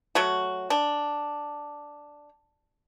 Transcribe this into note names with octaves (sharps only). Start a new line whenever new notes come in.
F#3 A3 F#4
D4